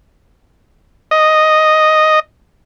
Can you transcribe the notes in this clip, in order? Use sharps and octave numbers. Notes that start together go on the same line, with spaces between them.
D#5